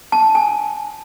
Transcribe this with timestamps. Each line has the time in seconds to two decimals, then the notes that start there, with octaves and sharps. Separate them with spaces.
0.12 A5
0.35 G#5